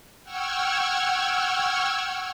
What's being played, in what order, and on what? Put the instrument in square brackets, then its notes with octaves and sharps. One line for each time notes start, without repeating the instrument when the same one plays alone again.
[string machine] F#5 G5 C#6 E6 F6 G#6